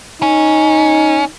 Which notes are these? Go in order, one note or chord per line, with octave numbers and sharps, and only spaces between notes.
C#4 D#4